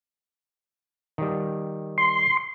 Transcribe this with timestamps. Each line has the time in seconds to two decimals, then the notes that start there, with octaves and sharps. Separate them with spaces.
1.18 D#3 G3
1.98 C6